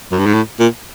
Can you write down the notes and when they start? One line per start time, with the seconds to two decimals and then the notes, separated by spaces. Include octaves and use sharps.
0.12 F#2
0.19 G2
0.26 G#2
0.33 A2
0.59 A#2